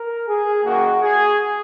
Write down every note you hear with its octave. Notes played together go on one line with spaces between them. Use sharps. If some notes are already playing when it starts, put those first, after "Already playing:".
Already playing: A#4
G#4
F#2 D#3 A#3 F#4
G#4